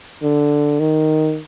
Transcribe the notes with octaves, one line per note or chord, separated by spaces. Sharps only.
D3
D#3